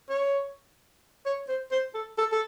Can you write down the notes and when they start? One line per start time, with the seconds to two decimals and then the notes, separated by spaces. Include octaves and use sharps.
0.10 C#5
1.26 C#5
1.49 C5
1.72 C5
1.95 A4
2.18 A4
2.32 A4